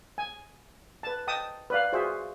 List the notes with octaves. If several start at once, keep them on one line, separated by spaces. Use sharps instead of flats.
G#5
B4 A5
D#5 G5 A5 D#6
B4 D5 F5
F4 F#4 G#4 C5 E5